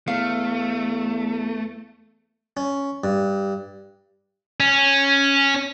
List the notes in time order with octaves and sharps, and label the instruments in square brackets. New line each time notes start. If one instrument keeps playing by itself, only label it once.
[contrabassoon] E2 [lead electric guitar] A3 [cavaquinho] F5
[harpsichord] C#4
G2
[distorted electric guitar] C#4